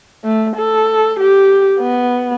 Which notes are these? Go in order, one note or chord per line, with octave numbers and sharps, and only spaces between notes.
A3
A4
G4
B3